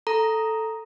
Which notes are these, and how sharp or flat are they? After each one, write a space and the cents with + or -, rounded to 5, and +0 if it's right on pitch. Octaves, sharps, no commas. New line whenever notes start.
A4 +0 A#5 +0